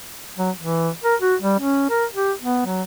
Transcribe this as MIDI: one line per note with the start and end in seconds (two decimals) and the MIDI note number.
0.37 0.50 54
0.59 0.89 52
1.03 1.15 70
1.20 1.35 66
1.41 1.58 55
1.59 1.88 61
1.90 2.05 70
2.14 2.32 67
2.42 2.63 59
2.65 2.82 54